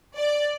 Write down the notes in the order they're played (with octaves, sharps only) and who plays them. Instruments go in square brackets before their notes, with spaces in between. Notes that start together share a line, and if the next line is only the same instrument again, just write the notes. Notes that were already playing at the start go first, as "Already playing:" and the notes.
[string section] D5